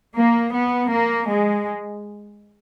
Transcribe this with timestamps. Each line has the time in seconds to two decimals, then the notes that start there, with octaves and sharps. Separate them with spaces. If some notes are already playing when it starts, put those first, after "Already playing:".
0.14 A#3
0.52 B3
0.89 A#3
1.28 G#3